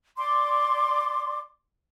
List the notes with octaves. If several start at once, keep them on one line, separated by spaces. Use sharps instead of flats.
D5 C6 D6